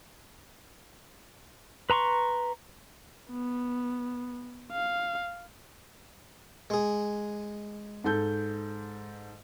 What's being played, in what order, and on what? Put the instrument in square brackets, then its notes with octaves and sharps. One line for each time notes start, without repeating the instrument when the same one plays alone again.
[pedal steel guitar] B4 A#5 C6 C#6
[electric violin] B3
F5
[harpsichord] G#3 G#4
[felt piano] G#2 A4 G6